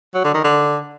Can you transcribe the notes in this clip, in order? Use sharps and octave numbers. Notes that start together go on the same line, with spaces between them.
F#3
D3
D#3
D3